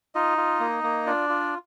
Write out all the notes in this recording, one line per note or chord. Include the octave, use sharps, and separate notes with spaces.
D#4 F4 D#5
F4
A#3
A#3
D4 F4 D5
F4